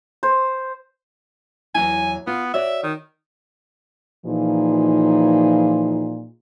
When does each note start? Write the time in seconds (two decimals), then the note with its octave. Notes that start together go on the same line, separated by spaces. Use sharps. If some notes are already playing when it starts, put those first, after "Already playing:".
0.23 C5
1.75 E2 F#3 E4 G#5
2.27 B3 F4
2.54 F#4 C#5 D5 E5
2.83 D#3
4.26 A#2 E3 F3 D#4 G#4